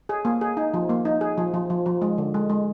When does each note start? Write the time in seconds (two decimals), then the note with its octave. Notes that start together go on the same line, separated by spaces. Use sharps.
0.09 G#4
0.25 A#3
0.41 G#4
0.57 D#4
0.74 F3
0.89 A#3
1.05 D#4
1.21 G#4
1.38 F3
1.54 F3
1.70 F3
1.86 F3
2.02 G#3
2.18 D3
2.34 G#3
2.50 G#3